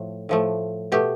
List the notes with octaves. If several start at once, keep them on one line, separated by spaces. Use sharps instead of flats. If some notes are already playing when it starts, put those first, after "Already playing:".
Already playing: A2 F3 A3
A2 F3 A3
B2 A3 G4